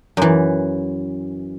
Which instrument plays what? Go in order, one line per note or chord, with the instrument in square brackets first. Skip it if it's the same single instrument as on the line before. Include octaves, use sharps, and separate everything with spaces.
[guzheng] F#2 E3